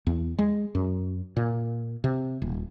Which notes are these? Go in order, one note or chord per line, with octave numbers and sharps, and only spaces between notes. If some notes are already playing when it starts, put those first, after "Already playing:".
E2
G#3
F#2
A#2
C3
D#1